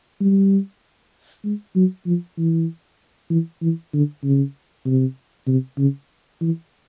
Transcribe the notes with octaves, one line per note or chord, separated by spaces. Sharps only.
G3
G#3
F#3
F3
E3
E3
E3
D3
C#3
C3
C3
C#3
E3